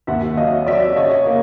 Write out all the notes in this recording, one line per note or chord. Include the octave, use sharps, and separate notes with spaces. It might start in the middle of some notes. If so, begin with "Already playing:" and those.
D#2 E5 F#5
F#3 D#5 F5
F#3 D5 E5
C#3 C#5 D#5
A#3